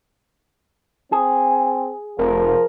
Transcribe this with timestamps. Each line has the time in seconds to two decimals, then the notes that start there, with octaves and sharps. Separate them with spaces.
1.12 C4 G#4
2.19 F1 F3 A#4